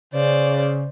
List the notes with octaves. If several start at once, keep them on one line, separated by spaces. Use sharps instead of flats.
C#3 C5 D5